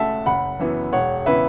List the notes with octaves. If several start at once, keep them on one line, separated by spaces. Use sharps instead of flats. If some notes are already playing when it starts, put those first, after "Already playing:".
Already playing: C#2 C#3 A3 E5 F#5 A5
F#1 F#5 B5
F#2 E3 B3
E1 C#5 F#5
C#3 E3 B3 B4 E5